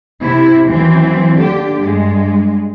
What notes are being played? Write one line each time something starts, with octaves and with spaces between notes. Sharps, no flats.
C3 E4
D#2 E3 F#3 A#3 C4
D#2 D3 G4
G2 G#3